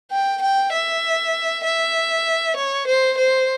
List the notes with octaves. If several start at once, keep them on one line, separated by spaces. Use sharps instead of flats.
G5
G5
E5
E5
C#5
C5
C5